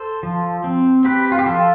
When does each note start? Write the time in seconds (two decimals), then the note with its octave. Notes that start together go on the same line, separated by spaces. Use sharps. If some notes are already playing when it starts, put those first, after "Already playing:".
Already playing: A4 C5
0.23 F3
0.64 C4
1.05 C4 G4 B4
1.32 F4
1.39 G4
1.46 F3 F4 A4